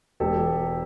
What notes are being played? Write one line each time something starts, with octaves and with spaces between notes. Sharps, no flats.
E1 G4 A4